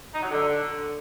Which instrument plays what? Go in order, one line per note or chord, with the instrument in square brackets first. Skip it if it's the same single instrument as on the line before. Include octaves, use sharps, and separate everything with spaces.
[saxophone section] D#4
F#3
D3